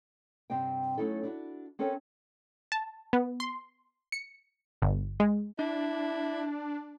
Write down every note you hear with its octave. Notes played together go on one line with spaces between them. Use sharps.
G2 C3 C4 D#5 G5
F#3 A3 C#4 D#4 E4 A4
D4 E4 F#4
C4 C#4 A4 A#4 C#5
A5
B3
C6
C#7
G1
G#3
D4 E4